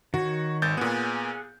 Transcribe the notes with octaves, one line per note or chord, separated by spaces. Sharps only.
D#3 F#4 C#5
G#1 G6 A6
A#2 B3 G#4 F#5